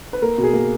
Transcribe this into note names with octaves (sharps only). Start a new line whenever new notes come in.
B4
A#3 A#4
B2
G#4
A#3